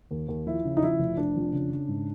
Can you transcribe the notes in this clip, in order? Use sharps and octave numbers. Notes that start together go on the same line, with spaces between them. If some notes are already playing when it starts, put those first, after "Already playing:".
D#2
D#2
F3 E4
C#3
D#4
F3 E4
F1
F1 D4
F2
C#3
C#3
G#2